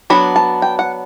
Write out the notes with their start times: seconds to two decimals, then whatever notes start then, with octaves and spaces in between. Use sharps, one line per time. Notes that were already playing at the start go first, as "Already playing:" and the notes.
0.10 F#3 B3 D4 B5
0.36 A5
0.62 G5
0.79 F#5